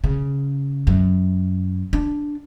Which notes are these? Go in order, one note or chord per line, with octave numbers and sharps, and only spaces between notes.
C#3
F#2
D4